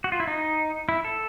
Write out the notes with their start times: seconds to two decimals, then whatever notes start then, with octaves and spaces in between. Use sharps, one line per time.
0.04 F#4
0.12 F4
0.20 E4
0.27 D#4
0.89 E4
1.04 A4